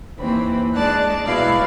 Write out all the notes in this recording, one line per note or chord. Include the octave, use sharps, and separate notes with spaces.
D#2 E3 C4 B5
G#3 D4 D5 A5 F#6
B2 G#3 E4 D5 F5